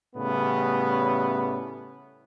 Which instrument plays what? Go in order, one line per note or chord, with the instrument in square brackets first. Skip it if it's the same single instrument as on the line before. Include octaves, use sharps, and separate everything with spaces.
[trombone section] A2 C#3 G3 B3